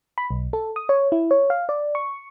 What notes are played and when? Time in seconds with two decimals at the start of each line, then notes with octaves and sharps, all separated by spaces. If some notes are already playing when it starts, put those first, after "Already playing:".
0.18 B5
0.31 B1
0.53 A4
0.76 D#6
0.89 C#5
1.12 E4
1.31 C#5
1.50 F5
1.69 D5
1.95 C#6